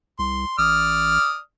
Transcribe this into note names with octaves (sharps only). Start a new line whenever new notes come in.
C2 C6
A1 D5 D#6 F6